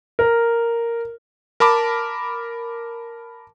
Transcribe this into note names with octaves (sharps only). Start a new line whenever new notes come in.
A#4
A#4 A5 B5 D6